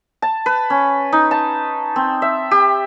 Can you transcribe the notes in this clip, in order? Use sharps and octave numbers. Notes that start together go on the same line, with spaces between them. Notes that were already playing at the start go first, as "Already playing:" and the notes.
A5
B4
C#4
D#4
A5
C4
E5
G4